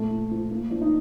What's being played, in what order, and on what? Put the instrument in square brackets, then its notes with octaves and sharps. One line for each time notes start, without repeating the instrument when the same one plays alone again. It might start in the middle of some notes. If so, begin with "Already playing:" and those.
Already playing: [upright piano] A#2 F3 A3
F3
F3
F3 A#3
F3 D4
D#4